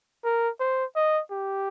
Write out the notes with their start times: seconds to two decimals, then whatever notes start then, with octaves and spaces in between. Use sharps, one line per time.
0.24 A#4
0.60 C5
0.96 D#5
1.31 G4